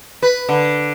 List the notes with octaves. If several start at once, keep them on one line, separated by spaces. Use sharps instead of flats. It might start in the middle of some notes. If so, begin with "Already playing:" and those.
B4
D3